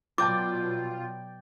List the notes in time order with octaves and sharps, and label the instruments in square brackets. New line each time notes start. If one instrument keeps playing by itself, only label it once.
[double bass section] B2 F#3 [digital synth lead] F4 [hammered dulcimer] D5 G5 [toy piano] A5 D6